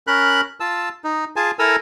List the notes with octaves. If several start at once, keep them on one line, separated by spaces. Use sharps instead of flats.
C#4 A#4 B5 F#6
F4 A5 E6
D#4
F4 G#4 G#5 A5
E4 A4 A#4 G#5 A#5 E6